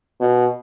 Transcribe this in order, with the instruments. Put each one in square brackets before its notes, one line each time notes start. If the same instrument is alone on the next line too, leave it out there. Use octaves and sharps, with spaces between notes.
[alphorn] B2